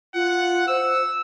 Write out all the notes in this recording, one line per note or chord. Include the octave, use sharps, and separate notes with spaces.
F4 F#5
C5 E6